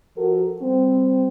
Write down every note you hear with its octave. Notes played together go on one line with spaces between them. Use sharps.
F3 F#4 A4 A#4
G3 C4